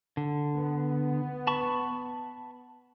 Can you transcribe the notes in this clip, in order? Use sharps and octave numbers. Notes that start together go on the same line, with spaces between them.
D3
B3
A5 B5 C#6